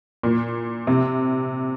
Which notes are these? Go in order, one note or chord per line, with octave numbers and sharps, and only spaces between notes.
A#2
C3